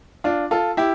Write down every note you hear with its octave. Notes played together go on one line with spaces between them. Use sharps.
D4 F4
F4 A4
E4 G4